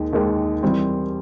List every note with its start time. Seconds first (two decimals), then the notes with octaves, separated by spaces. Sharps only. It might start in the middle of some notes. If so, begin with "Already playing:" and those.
Already playing: D#2 D#3 G#3
0.13 D#2 D#3 G#3
0.63 E3 G3 C4